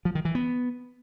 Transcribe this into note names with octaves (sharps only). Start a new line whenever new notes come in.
F3
D#3
E3
B3